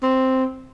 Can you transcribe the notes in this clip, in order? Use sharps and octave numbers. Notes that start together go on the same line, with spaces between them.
C4